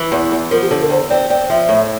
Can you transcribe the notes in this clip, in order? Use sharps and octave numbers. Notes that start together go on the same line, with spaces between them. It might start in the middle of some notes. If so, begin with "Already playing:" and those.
Already playing: E3
E2
E2
F3 A#4
G4
D3 A4
A#4
E2 C5
C4 D5
C4 D5
F3 E5
A2